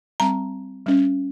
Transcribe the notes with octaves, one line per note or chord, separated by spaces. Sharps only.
G3 C4 A#5
G3 C#4